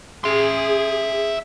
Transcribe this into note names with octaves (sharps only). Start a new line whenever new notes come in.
G#4 E5 C6